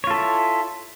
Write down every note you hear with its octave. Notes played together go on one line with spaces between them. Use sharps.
E4 F4 A4 C#5